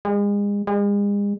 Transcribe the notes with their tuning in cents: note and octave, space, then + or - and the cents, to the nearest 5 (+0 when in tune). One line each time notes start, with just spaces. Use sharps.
G#3 -35
G#3 -40